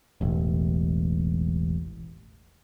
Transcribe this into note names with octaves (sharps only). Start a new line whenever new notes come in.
E1 A1